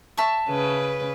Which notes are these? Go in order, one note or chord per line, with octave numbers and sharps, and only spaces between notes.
E5 A5 C#6
C#3 B4